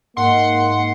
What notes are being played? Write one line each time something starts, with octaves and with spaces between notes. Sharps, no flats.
G#2 A#3 F#5 C6